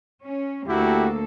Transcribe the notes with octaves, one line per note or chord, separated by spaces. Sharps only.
C#4
D2 A#3 E4 F#4 G4 A4